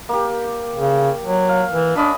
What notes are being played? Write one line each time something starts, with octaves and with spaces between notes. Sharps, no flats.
A#3 G4
C#3
F#3
F5
E3
C#4 D4 D#5 B5